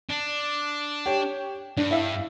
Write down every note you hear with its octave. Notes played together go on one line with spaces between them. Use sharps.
D4
G4 C#5
G2 D4
E4 E5 F5